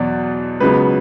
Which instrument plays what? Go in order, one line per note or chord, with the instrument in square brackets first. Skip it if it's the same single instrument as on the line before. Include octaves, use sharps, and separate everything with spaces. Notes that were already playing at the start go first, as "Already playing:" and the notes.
Already playing: [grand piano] E2 B2 F#3 D5
C#2 C#3 F#3 B3 B4